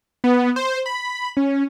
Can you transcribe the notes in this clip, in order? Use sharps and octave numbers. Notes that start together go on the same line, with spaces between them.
B3
C5
B5
C#4